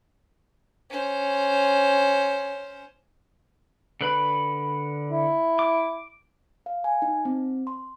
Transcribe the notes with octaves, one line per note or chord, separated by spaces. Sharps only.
C#4 C5
D3 B4 B5
E4
D6
F5
G#5
D#4
C4
C6